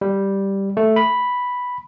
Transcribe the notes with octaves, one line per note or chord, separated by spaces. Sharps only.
G3
A3
B5